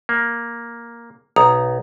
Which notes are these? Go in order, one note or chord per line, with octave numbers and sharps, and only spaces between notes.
A#3
B1 A#5 D#6